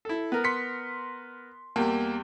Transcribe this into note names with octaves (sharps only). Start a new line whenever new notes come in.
E4 A4
B3 A#4
C6 B6 C#7
E2 G3 A#3